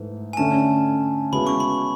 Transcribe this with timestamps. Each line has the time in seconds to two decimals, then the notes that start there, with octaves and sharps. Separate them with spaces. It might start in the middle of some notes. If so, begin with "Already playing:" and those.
Already playing: G#2 E3 A3
0.33 G#5
0.37 D3 A3 C#4 A5
1.33 C#3 E3 G#3 B3 F#4 B5
1.47 C#6
1.60 B5